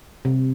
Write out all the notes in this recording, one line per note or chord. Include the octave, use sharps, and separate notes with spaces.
C3